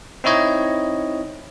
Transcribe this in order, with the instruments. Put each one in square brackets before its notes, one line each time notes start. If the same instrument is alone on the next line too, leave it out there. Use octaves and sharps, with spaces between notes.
[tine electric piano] C4 D#4 E4 C#5 D#5